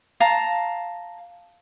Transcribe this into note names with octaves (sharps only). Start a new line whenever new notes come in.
F5 A5 A#5